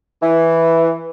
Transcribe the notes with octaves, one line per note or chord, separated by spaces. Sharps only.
E3